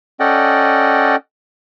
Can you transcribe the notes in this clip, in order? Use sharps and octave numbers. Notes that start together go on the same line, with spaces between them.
C#4 A4 D5 D#5 F#5 G5